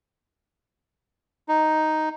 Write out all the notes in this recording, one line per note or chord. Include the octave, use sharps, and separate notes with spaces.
D#4